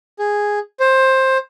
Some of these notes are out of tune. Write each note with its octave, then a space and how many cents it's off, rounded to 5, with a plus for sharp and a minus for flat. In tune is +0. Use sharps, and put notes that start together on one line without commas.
G#4 -5
C5 +15